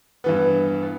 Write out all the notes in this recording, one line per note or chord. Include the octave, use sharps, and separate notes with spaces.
G2 E3 B3
B3